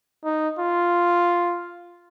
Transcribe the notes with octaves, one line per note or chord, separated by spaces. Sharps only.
D#4
F4